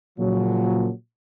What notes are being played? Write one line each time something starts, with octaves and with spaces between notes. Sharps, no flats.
A#2 C#3 F3 F#3